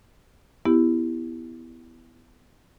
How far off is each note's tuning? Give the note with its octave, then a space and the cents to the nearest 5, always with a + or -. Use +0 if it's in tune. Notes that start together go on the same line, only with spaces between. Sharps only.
B3 +10 E4 +0 G4 +0